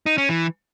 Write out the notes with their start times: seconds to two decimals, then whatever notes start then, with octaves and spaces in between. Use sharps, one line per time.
0.06 D#4
0.18 C#4
0.29 E3